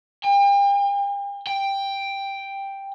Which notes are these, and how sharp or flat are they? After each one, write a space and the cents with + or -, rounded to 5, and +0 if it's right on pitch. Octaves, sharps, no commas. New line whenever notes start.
G5 +40
G5 +5